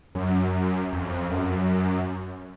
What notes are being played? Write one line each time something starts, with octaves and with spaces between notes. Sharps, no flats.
F#2
F2
F#2